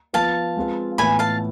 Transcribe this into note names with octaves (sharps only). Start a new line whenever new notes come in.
F3 B3 F4 B4 F5 A5
G#3 C4 F4 B4
A2 E3 B3 G#5 B5
F5 A5